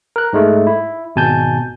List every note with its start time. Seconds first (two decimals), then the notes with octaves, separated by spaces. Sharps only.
0.16 A#4 F#6
0.33 G#2 G#3 A3
0.67 E4
1.16 G#1 B2 G#5 A5 G6